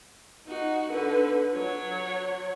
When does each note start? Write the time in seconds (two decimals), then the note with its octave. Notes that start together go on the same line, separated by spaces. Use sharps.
0.47 D#4 F#4
0.90 D3 B4
1.54 F#3 C#5